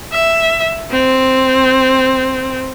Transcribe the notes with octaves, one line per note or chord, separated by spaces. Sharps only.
E5
C4